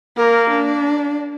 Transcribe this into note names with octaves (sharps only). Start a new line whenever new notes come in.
A#3 A#4
D4